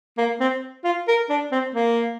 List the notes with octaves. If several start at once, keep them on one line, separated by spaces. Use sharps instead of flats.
A#3
C4
F4
A#4
D4
C4
A#3